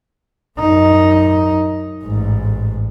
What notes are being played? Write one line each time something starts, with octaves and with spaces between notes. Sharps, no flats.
F#2 D#4
A1 G#2